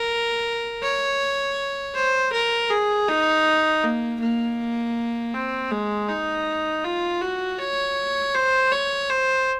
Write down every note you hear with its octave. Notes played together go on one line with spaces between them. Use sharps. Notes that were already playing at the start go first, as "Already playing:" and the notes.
Already playing: A#4
C#5
C5
A#4
G#4
D#4
A#3
A#3
C4
G#3
D#4
F4
F#4
C#5
C5
C#5
C5